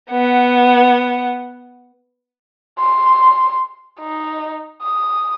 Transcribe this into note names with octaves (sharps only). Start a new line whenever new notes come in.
B3 F#5
C6
D#4
D#6